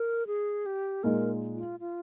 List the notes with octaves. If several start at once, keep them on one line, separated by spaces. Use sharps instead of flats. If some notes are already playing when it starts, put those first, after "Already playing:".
Already playing: A#4
G#4
G4
A#2 G#3 D#4 A#4
F4
F4